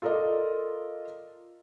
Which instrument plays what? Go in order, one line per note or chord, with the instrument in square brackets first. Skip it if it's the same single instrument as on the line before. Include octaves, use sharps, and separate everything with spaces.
[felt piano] F4 A4 A#4 D5 D#5